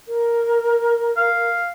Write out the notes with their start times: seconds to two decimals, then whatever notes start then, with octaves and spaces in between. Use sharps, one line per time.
0.08 A#4
1.17 F5